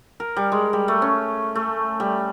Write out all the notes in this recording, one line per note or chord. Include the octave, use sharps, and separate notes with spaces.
A#4
G3
G#3
G3
A3
C#4
A3
G3